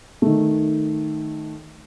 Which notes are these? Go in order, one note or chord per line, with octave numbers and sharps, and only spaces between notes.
D#3 A3